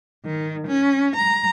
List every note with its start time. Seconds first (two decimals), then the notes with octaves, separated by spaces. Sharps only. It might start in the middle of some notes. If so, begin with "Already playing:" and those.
0.24 D#3
0.67 C#4
1.15 A#5